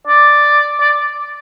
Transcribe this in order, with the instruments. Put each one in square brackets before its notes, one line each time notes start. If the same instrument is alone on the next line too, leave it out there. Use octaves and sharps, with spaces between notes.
[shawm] D5
D5